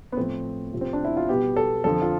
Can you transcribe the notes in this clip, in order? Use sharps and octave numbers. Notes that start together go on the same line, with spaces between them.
B3
A2 F3 A3 C4
F2 C3 F3 A3
C4
D4
E4
F4
B2 G3 B3 G4
A4
F2 D3 F3 A4
F4